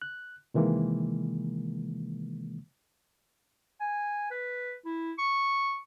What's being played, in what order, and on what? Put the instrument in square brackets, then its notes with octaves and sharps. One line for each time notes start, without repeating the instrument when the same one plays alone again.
[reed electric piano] F#6
C3 D#3 E3 G#3 A#3
[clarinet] G#5
B4
E4
C#6